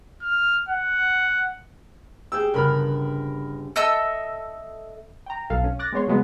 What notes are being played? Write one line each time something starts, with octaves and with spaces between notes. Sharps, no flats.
F6
F#5
G4 G#4 E6 G6
G1 C#3 B3 A#4 B5 F6
A4 D#5 E5 E6
G5 A#5
B1 A4 F5
C#4
D6 F#6 A6 A#6
G#3 B3 C#5 C6
C#3 F#3 G#3 B3